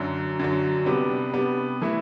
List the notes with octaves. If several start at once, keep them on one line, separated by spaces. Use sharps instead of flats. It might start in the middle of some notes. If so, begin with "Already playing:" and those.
Already playing: F#2 D3 F#3
F#2 D3 F#3
C3 G3 B3 D4
C3 G3 B3 D4
E3 A3 E4